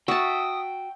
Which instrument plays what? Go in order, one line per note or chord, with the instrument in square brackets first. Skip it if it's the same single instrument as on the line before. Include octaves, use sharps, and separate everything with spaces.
[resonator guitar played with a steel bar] F#4 [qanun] E5 A5 [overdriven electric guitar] G5 [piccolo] D#6